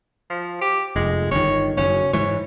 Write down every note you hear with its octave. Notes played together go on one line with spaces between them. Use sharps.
F3
G4
F1 G#3
G1 D#3 C#5
F#1 C#4
G#2 E3 C#5